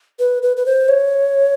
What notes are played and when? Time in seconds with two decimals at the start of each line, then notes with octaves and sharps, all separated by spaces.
0.19 B4
0.42 B4
0.57 B4
0.66 C5
0.88 C#5